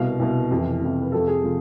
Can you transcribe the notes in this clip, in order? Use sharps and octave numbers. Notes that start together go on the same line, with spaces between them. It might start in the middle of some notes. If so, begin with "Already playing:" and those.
Already playing: C2 B2 F5
C2 B2
F2 C3 E3
F2 C3 E3
B4
F2 C3 F3 A4
G#4
C3 F3 F4